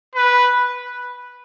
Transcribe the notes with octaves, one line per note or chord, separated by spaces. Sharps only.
B4